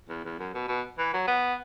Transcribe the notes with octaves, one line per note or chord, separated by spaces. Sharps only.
E2
E2
F#2
B2
B2
E3
F#3
B3